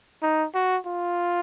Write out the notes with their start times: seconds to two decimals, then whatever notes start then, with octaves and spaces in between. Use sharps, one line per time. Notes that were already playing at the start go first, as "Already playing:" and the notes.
0.23 D#4
0.55 F#4
0.87 F4